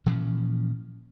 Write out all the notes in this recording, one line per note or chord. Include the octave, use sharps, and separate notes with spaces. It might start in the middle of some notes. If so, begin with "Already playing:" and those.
A#2 E3 F3 C#4